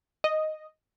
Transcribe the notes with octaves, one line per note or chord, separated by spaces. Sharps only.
D#5